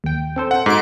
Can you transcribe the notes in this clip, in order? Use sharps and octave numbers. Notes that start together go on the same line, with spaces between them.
D#2 G5
C4 A4 C5
F#5
G#2 D#4 F#4 D7